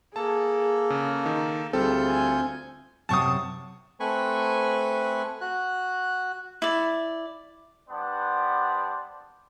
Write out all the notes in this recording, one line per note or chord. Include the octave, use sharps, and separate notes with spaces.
A#3 G#4 A4 A5
C#3
D#3 A5
D2 G3 C4 F4 G#4 A4 G6
G#5
F#2 C3 A5 C#6 D#6
A3 C4 B4 G#5 B5 C#6
F#4 F#6
E4 D5
G3 B3 D4 C5 D5 F#5